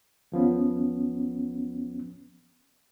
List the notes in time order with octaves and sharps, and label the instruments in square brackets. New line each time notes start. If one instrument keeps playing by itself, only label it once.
[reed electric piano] D#2 F3 B3 C#4